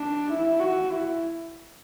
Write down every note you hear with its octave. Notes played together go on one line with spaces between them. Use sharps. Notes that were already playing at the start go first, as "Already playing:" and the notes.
Already playing: D4
E4
F#4
E4